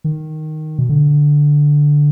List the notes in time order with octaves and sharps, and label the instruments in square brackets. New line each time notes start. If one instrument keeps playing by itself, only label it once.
[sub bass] D#3
B2
D3